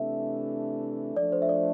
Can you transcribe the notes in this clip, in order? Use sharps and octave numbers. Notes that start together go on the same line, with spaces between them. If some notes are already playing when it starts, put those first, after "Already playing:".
Already playing: C3 E3 A3 D4 E5
F3 A3 D4 D5
C5
E5
D5